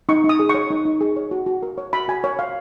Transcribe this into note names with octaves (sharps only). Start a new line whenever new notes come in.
D#4 C#6
D#4
D#6
G#4
C#5 C#6
D#4
D#4
G#4
C#5
F#4
F#4
A#4
C#5
F#4 B5
F#4 G#5
A#4 C#5
C#5 F5